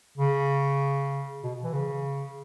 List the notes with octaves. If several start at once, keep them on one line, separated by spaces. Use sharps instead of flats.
C#3
B2
E3
C#3